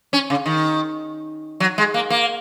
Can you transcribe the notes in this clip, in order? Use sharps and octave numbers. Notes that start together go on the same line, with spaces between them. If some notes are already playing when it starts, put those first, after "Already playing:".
C#4
C#3
D#3
F#3
G#3
A#3
A#3